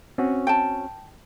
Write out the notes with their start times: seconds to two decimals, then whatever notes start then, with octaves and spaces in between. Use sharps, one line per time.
0.18 C4 C#4 F#4
0.47 G5 A5